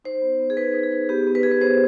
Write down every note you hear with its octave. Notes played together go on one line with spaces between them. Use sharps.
D#4 C5
B3
B3
G#4
D#4 B4
D#4
G#4
D#4
B3 G4
B3
B4
B3 G#4
B4
B3 C5